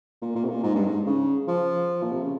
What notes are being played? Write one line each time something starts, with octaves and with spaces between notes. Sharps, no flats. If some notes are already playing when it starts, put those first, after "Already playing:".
A#2
A#2
C3
A#2
G#2
G2
G#2
C#3
F3
A#2
C3
C#3